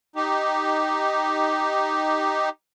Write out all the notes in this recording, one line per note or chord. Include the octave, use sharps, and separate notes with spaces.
D#4 G4